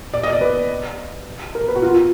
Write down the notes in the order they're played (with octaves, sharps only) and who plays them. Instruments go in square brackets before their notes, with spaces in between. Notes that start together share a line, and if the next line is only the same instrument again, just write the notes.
[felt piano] D5
D#5
D5
B4
A#4
B4
F#4
F4